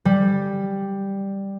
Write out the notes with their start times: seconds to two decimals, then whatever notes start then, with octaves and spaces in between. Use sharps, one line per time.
0.05 G3